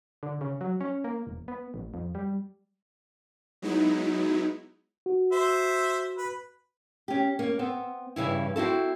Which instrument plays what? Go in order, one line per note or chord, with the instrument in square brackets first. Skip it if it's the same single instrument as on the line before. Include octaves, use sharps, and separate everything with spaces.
[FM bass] D3
C#3
F#3
C#4
A#3
E1
B3
A1
F2
G3
[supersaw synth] F#3 G#3 B3 D#4 E4
[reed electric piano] F#4
[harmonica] C5 E5
B4
[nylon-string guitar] C#4 G4
A#3 C#4
B3 C4
G2 C#3 E3 E4
C4 E4 F#4 A4